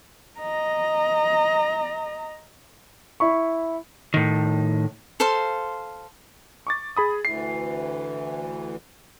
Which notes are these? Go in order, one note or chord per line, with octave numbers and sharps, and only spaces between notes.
D#5 A#5
E4 B5 C#6
A2 D#3
A4 C5 F5 C6
C#6 D6 A6
G#4 B5 D#6
D2 E3 C7